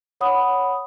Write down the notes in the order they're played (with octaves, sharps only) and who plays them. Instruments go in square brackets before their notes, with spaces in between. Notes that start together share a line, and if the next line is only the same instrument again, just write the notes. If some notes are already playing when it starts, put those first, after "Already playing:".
[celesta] C#5 F#5 B5 D#6